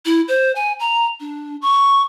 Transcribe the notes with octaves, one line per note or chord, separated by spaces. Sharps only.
E4
C5
G#5
A#5
D4
C#6